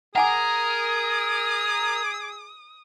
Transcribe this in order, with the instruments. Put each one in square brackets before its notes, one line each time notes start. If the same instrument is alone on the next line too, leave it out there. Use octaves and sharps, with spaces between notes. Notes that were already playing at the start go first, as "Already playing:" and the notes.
[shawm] G#4 [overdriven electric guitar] A#4 [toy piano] F#5 G#5 D6 [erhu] D#6